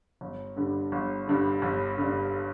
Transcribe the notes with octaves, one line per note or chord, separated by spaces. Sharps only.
G1
G2 D3
G1
G2 D3
G1
G2 D3